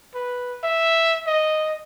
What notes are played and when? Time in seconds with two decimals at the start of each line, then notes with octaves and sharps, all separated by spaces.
0.15 B4
0.64 E5
1.27 D#5